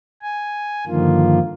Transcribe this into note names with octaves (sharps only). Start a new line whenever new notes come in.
G#5
G2 D3 D#3 F3 A#3 F4